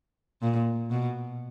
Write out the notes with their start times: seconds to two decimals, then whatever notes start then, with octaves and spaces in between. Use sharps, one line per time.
0.42 A#2
0.91 B2